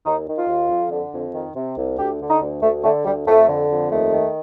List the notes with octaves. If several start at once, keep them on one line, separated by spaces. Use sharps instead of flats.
D#2 D#4
D#3
F4
D#2
F2
D3
F2
D#3
C3
C2
D2 G4
D3
D#4
D2
D2 A3
D3 A3
D2 G3
F2 A3
D3
F2
D#2 A3
D#3